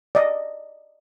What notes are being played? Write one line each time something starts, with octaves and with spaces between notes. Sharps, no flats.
D5 D#5